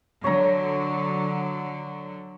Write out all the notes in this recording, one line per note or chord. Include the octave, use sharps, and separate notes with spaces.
D3 F#3 C#5 A#5